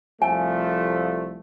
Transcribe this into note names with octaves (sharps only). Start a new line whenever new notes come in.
C2 F3 A3 G#5